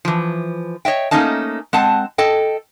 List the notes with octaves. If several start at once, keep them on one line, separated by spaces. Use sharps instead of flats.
E3 F3
C#5 D#5 E5 G5
A3 A#3 C#4 D#4 D#5 A5
G#3 C4 F#5 A5
A4 D#5 G5